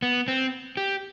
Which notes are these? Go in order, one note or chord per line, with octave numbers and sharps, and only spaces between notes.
B3
C4
G4